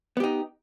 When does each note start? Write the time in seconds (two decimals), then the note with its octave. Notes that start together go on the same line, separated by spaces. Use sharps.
0.17 B3
0.20 G4
0.23 D#4